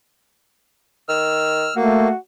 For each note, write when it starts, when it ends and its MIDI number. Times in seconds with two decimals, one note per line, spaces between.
1.09 1.70 51
1.09 1.74 88
1.09 1.74 89
1.76 2.10 57
1.76 2.08 58
1.76 2.16 66